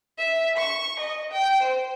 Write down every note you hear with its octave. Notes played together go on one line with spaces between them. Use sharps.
E5
C#6
D#5
G5
C5